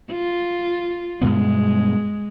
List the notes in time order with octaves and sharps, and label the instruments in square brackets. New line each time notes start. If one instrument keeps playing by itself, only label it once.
[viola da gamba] F4
[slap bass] G2 B2 B3 [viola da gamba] G#3